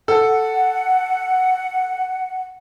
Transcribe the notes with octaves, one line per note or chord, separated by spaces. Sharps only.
A4 F#5